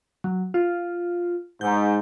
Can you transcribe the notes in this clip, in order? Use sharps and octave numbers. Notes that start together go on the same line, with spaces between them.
F#3
F4
G#2 G6